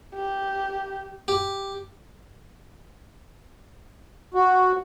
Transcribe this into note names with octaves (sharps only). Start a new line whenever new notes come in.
G4
G4
F#4